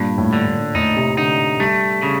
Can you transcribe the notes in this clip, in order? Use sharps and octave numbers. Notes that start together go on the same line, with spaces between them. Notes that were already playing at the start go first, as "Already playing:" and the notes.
Already playing: G2 A#2
A2
D3
A2
A2 D#4
C3
D3 D#4
G3 A3
C#3